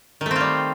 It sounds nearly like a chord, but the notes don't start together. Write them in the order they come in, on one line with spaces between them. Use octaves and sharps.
D#3 A3 C4 F4 G3